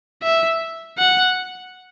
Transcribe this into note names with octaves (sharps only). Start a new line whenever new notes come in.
E5
F#5